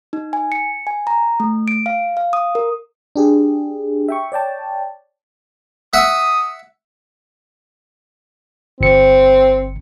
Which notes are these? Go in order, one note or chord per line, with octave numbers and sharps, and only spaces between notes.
D#4
G#5
C#7
G#5
A#5
A3
D7
F5
F5
D#6
A#4
D4 G4 G#4
E5 G5 C#6
C#5 D5 G5 A5
E5 F#5 D#6
G1 C4 C#7